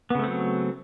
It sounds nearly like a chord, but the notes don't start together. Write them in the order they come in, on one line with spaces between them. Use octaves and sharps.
B3 C#3 A3 C4 F#3